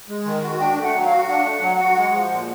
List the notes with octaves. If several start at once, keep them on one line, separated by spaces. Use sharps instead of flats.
G#3
D#3
F#4
D4 G5
A3
F#5
F#3
F5
F#4
D4 F#5
A3
F#3
F#4
G#3
F3
A#2